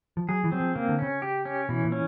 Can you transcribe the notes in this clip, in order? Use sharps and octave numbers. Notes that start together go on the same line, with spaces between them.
F3
F#3 G#4
E3
F#3 C4
F3
C#3 A#3
D3
C#3 C#4
G4
C#4
B2 E3
A#2
C#4